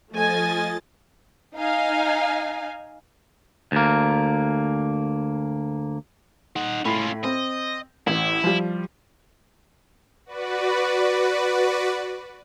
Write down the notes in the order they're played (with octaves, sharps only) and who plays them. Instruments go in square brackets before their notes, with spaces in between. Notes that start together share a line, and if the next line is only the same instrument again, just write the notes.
[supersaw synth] F3 D#5 A6 [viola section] A3 G#5
[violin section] D#4 F5 G#5
[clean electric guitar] D2 A#3
[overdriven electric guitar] D#4 F#5
[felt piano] A2 B5 [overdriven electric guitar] C#4 F4
[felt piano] C4 [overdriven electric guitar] D#5
[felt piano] A1 [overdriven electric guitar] E4
[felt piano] F3 G3
[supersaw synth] F#4 B4 D5